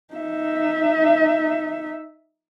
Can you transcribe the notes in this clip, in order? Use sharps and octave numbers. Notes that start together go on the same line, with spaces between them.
D#4 E5